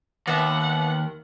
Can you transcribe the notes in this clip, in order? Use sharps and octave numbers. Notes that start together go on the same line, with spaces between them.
D#2 B3 E5 F#5